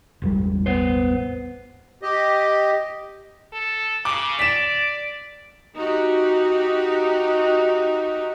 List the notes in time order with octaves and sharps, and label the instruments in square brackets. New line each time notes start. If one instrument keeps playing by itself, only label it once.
[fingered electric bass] E1 A1 G3
[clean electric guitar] B3 C5
[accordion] G4 D#5
[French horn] A4
[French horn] C#3 [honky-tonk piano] D6
[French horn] D5 [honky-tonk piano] B6 E7
[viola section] D#4 F#4 G4